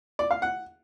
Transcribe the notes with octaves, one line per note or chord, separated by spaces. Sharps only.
D5
F5
F#5